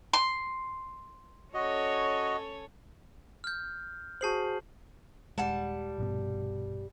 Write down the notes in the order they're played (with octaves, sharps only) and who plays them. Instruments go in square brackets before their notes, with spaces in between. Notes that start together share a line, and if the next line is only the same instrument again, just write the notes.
[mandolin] C6
[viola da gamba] C#4 A4 C#5 [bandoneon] F#4 D#5
[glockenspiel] F6 G6
[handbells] F#4 G#4 C5 [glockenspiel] A5 C7 F#7
[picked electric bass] D#1 G#3 [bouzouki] G3 F#5 A5
[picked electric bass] A#1 G2 B2